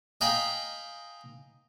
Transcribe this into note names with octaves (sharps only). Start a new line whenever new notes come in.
D#5 F5 G5 G#5 A#5 B5